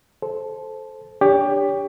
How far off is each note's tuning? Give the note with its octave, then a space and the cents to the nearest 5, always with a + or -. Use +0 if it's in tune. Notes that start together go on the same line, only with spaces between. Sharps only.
A4 -15 C5 +0
D4 +0 G4 +20 C#5 +30